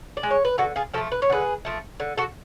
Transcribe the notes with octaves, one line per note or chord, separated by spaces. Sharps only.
D5
G#3
C#5
B4
D3 F#4 A4
F4 G#4
F3 A3 F#4 A4
B4
C#5
D3 G#4 B4
F3 A3
D3
F#4 A4